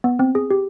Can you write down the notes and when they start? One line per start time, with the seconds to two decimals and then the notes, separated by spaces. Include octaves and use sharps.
0.04 B3
0.19 C4
0.35 G#4
0.51 G4